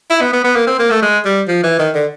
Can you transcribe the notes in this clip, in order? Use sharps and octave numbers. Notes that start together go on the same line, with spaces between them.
E4
B3
B3
B3
A#3
C4
A#3
A3
G#3
G3
F3
E3
D#3
D3